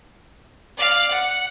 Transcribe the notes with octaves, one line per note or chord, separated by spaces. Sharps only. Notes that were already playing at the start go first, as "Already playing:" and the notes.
D5 F5
F#5